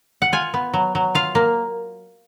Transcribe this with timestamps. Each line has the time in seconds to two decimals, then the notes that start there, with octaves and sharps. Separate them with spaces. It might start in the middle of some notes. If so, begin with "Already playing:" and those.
0.22 F#5
0.33 F4 G#5
0.54 B3
0.74 F#3
0.95 F#3
1.15 F4 F5
1.35 A#3